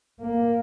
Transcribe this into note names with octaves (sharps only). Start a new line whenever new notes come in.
A#3